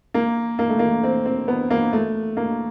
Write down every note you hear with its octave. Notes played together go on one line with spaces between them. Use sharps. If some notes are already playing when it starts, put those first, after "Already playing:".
A#3
A#3
A3
A#3
C4
C4
B3
A#3
A3
A#3